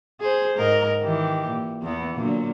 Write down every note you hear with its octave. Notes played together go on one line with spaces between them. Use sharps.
G#4 C5
G#2 A#4 D#5
D#3 E3 G4
A#2
E2 E3 B3
A#2 D3 F#3